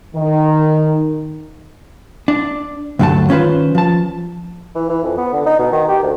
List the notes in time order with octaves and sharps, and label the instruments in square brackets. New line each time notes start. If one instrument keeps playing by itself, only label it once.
[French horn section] D#3
[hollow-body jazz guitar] D4
D2 G2 D3 F#3 A3 A5
D#3 C#4 F4 B4 C5
F3 A5
[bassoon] E3
E3
F2
B3
D3
D#4
B2
D#3
G4
D2